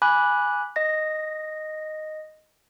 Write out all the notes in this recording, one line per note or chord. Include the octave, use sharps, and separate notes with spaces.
G#5 B5 D6 F#6
D#5 A#6